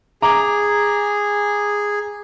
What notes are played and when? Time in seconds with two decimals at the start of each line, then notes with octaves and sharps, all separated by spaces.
0.22 G#4 A#5 D6